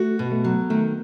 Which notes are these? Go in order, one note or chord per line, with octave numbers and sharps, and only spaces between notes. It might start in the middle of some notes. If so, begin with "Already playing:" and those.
Already playing: A3 F#4
B2
A3
F#3
D#3 A3